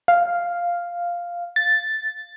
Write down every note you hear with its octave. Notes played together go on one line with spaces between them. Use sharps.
F5
A6